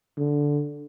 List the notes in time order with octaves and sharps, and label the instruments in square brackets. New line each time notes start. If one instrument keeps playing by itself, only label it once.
[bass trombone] D3